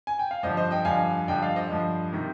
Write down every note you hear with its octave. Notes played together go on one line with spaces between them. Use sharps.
G#5
G5
F5
G2 D3 F3 C5 D#5
C5 D#5
D#5 G5
G2 D3 F3 F5 G#5
G2 D3 F3 D#5 G5
D5 F5
C5 D#5
G2 D3 F3
C3 D#3